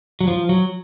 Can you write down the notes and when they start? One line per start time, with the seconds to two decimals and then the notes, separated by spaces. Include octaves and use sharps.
0.21 F#3
0.28 F3
0.49 F#3